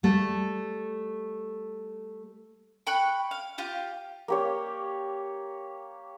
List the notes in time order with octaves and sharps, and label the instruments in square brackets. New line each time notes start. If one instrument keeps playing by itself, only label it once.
[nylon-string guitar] G3 A3
[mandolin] G5 B5 C#6 F#6
F5
F4 G4 G5
[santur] A#3 G4 C#5